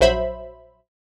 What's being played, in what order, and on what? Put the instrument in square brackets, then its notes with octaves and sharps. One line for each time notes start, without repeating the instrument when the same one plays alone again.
[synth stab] A#1 F#3 C5 E5 B5